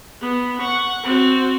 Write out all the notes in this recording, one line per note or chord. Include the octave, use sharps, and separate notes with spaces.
B3
F#5 C#6
C4 F#4